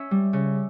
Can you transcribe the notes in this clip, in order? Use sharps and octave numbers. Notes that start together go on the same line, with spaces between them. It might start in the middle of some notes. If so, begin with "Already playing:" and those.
Already playing: C#4 E5
G3
C#3